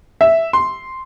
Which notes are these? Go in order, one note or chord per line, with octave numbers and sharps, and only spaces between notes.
E5
C6